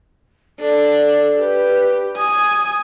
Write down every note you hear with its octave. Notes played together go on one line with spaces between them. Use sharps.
D4 A4
G4 B4
G#5 D#6